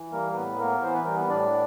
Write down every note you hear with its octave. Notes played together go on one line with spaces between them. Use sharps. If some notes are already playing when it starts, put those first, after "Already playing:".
Already playing: E3
G3 A#3 A#4
A#4
A2 B3 B4
A#3 B3 A#4
E3 C5
B4
G3 A#4
B3 B4
A2 D4 D5